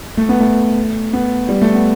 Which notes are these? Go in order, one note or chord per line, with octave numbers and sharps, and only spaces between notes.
A3
B3
A3
B3
G3
A3
B3